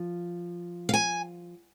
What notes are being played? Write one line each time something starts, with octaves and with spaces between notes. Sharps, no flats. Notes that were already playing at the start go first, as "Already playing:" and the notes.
Already playing: F3
F5
G#5